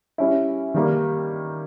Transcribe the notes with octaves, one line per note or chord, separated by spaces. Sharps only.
G3 C#4 E4
D#3 G3 A#3